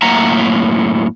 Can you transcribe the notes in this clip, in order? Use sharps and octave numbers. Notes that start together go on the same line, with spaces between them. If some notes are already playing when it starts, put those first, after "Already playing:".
F#2 A2 A#3 E5 F#5 A#5